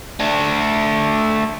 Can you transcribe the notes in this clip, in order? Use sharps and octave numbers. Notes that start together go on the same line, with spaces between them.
A3 D4